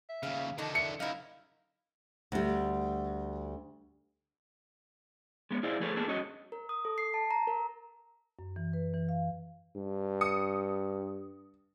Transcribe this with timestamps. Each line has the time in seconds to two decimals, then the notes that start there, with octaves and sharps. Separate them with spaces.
0.09 E5
0.23 D#2 C#3 F5
0.58 D3 D#3 F3 D4 D#4 A4
0.75 E5 C#7
1.00 F#2 D#4 E4 A#4 F5
2.32 D2 G3
5.51 G#3 B3 A#4 C#5
5.63 E4 G#4 C5 D5 F5
5.80 F3 A3 G#4 A4 B4 C#5
5.96 A#3 B3 D4 G#4 A4
6.08 G2 C#4 F#4 C#5 D#5
6.52 A#4
6.69 D#6
6.85 A4
6.98 C7
7.14 A5
7.31 A#5
7.47 A#4
8.39 F#2
8.56 E3
8.73 B4
8.94 E3
9.09 F5
9.76 G2
10.21 D#6 C#7